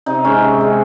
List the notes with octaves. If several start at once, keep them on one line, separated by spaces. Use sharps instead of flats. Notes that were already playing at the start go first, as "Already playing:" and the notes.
C3 D#4
D#3 G#3 C#4
C3
D#3 G#3